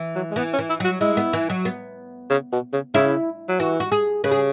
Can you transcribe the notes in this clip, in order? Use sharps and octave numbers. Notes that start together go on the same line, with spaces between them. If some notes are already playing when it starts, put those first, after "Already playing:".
Already playing: E3
F#3
G#3
E3 B3
C#4
E3
E4
F#3 F#4
G#3 E4
B3
E3
F#3
B3
C#3
B2
C#3
C#3 E4
F#3
E3 F#4
F#4
G#4
C#3 B4
G#4